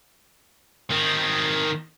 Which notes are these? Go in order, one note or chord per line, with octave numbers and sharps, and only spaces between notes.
D#3 C4